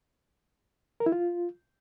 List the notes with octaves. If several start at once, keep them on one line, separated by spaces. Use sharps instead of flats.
A#4
E4
F4